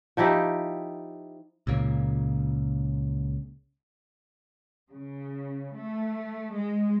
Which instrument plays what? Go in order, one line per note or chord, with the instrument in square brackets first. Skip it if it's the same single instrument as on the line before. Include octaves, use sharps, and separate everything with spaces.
[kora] F3 D#4 E4 G4
[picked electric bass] C#2 A#2 C#3 A#3
[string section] C#3
A3
G#3